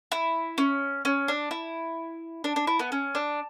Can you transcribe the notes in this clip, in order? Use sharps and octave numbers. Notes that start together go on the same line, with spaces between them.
E4
C#4
C#4
D4
E4
D4
D4
E4
B3
C#4
D4